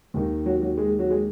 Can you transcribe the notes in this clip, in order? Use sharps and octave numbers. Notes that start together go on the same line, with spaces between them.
D#2 D#3
F#3
F#3
G#3
F#3
G#3